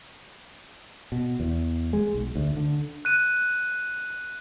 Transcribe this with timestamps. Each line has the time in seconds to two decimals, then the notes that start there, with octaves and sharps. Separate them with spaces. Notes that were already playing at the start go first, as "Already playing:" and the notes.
1.12 B2
1.40 E2
1.93 G#3
2.14 B1
2.36 D2
2.56 D3
3.05 F#6 D#7